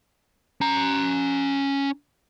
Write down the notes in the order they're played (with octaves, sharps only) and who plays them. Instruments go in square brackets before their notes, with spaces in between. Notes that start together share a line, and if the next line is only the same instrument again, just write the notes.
[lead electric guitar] C#4 A#5